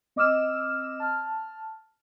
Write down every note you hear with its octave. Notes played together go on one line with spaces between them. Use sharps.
C4 D#5 D6 E6 F6 E7
A5 F6